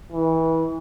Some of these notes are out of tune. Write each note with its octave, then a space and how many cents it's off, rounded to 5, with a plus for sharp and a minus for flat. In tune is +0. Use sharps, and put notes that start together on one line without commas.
E3 -25